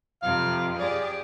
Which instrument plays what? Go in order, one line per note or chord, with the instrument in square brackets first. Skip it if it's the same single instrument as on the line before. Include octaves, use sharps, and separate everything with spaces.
[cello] F2 C3 [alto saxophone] F5
[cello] G4 G#4 [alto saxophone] D5